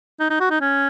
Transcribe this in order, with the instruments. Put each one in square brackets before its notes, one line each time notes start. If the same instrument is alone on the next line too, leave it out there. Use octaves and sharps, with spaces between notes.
[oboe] D#4
D#4
F#4
D#4
C#4